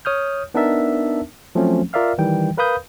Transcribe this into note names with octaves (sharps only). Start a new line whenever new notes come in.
C#5 D#6 F6 G6
B3 D4 D#4 A#4 E5 A5
F3 F#3 A3 C4 C#4
F4 A#4 D5 E5 F5 F6
D#3 E3 G3 G5
A#4 B4 F5 B5 D#6 G6